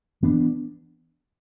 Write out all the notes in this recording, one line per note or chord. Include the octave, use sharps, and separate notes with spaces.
E3 B3 D4